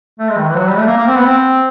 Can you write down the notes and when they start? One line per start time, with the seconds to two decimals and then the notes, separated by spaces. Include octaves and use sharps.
0.19 A3
0.29 G#3
0.38 D#3
0.48 E3
0.57 F#3
0.67 G3
0.77 A3
0.87 A#3
0.97 A#3
1.07 C4
1.16 B3
1.26 C4